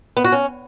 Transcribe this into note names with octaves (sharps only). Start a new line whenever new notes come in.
B3
F#4
C#4